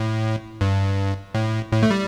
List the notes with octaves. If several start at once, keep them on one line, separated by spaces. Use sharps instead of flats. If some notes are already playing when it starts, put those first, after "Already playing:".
Already playing: A2
G2
A2
A2
A3
G3